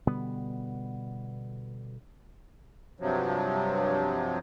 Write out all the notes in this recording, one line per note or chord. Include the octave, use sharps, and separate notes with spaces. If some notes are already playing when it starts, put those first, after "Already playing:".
B2 D3 G3 B3
G2 C3 F3 F#3